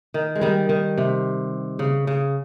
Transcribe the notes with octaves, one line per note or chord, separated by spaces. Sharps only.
D#3
G#3
D#3 G3
D#3
C3
C#3
C#3